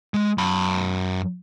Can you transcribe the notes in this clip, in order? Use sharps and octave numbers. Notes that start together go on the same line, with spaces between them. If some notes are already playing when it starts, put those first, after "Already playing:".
G#3
F#2 B5